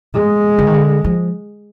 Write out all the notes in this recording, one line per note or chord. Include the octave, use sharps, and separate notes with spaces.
G#3
D3
D#3
D3
F3